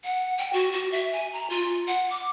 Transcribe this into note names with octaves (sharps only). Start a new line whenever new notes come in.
F#5
G5
F#4
F#4
E5
G#5
A#5
F4
F#5
D6